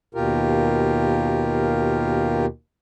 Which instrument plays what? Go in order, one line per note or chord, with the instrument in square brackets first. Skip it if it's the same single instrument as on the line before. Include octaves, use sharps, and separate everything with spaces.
[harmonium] D#2 B2 F4 G4 A#4